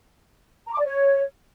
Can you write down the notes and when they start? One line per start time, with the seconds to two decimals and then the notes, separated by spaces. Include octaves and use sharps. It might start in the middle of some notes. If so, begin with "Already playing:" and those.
0.66 A#5
0.72 D6
0.78 D5
0.84 C#5